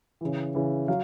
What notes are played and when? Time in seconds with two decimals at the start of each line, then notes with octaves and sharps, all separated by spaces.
0.21 C#3 E3
0.55 C#3 E3
0.88 F#3 F5